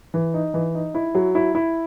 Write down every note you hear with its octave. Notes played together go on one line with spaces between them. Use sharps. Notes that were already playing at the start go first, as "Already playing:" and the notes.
E3
D#4
E3
D#4
E4
F#3
E4
E4